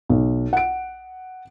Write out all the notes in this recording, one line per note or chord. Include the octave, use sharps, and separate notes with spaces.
B1
F#5 D7